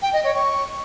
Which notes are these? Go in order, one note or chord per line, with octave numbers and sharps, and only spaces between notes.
G5
D#5
C#5
C#6